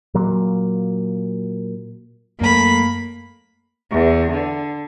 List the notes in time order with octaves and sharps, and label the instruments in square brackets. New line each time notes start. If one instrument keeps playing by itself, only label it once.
[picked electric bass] A#2 F#3 A#3
[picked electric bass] F#2 A3 [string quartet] A#3 B5
[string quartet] E2
D3